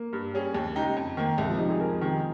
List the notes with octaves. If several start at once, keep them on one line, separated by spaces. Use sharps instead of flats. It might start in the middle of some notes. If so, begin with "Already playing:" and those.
Already playing: A#3
G2
G3 C#4 G#4
D#2
C#3 G#3 D#4 G4
F2
D#3 A#3
C2 G#3
F3
C3 G3 D#4
G#4
F2 A#4
C3 D#3